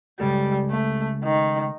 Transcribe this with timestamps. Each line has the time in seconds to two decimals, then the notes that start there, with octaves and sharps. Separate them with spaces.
0.20 C#3 G3 G#3 A4
0.70 A3
1.24 D#3